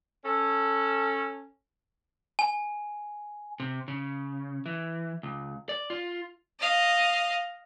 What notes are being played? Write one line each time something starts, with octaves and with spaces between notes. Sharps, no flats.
C#4 A4
G#5
C3
C#3
E3
C#2
D5
F4
D#5 F5